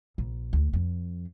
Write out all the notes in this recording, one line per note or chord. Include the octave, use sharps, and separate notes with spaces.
A#1
D2
F2